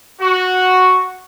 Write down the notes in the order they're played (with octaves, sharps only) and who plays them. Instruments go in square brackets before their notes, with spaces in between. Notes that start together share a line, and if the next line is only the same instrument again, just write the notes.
[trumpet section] F#4